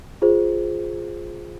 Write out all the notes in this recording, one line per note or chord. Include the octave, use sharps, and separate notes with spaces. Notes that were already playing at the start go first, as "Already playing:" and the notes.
F4 G#4 C5